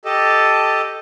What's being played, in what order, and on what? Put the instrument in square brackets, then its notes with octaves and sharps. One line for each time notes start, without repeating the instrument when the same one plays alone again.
[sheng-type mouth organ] G4 A4 D#5 A5